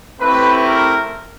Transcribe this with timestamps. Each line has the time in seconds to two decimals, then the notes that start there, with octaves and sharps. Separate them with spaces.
0.20 A3 C4 E4 G4 B4
0.66 A#4